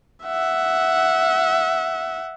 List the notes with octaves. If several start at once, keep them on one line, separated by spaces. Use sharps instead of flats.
E5 F#5